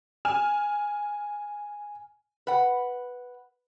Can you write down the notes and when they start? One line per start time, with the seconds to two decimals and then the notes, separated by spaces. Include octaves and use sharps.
0.25 G#5 F6 E7
2.47 B4 F#5